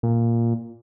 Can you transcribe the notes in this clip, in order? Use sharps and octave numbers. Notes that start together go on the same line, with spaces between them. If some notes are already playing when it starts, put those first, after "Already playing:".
A#2